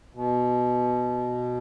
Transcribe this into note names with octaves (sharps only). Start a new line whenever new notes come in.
B2